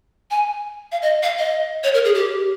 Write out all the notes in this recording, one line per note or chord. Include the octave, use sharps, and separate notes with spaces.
G#5
F5
D#5
F5
D#5
C#5
A#4
G#4
G4